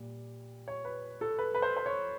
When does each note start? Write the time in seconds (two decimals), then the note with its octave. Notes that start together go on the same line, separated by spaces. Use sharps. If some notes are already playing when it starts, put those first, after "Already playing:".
Already playing: A#2 G3
0.68 C#5
0.85 B4
1.21 A4
1.39 B4
1.55 B4
1.62 C5
1.77 C5
1.86 C#5